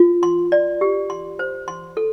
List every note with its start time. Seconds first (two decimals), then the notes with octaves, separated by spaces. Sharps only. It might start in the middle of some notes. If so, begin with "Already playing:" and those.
Already playing: F4
0.23 C6
0.52 D5
0.81 G4
1.10 C6
1.39 C5
1.68 C6
1.97 A4